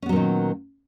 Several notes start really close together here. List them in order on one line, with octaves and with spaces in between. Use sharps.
C#4 B3 F#3 A#2 D#3